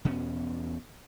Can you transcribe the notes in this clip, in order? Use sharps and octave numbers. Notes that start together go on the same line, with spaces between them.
E2 B2 B3 C#4